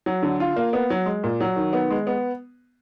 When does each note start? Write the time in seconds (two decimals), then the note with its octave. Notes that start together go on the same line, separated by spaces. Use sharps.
0.06 F#3
0.23 D3
0.40 F4
0.56 A#3
0.73 B3
0.90 F#3
1.06 G#3
1.24 A#2
1.41 F#3
1.56 D#3
1.73 B3
1.90 G#3
2.07 B3